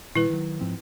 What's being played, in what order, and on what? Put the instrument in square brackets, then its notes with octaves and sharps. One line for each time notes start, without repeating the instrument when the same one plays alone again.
[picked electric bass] A#2 D#3 G3 [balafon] E4 B4
[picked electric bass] D#3 F#3
G#2 F3 C4